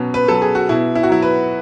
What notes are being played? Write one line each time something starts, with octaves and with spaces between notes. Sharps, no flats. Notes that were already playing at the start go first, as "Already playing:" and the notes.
Already playing: B2 F#3 C#4
B4
F#3 A4
G#4
F#4
B2 E4
E4
F#4
F#3 E4
B4